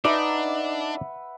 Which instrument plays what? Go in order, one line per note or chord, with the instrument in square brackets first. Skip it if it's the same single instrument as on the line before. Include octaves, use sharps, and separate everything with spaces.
[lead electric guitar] D4 [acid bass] D#4 [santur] B4 E5 F#5 [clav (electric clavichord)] D5